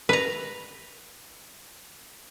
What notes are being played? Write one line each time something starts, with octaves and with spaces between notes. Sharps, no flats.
B4 A#5